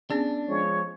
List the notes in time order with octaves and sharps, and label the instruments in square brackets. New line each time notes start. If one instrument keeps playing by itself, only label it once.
[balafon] B3 C#4 G#4 [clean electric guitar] D4
[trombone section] F3 G#3 [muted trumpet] C#5